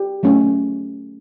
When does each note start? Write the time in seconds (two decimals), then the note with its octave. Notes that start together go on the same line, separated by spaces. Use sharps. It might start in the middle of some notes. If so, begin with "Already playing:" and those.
Already playing: G4
0.23 F#3 A3 C#4